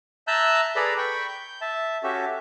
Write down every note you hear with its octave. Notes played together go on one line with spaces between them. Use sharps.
E5 A5 A#5 E6 F#6 G6
G#4 A4 B4 D5 A#5 B5
G5 B5 C#6
G6
E5 A5
C#4 F#4 G4 A4 E5